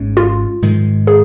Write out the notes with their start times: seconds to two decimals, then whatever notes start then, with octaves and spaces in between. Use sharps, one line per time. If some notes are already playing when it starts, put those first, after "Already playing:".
Already playing: G#1 G#2 G#3 C#4
0.17 F4
0.62 G#2 D#3 G#3
1.07 G#4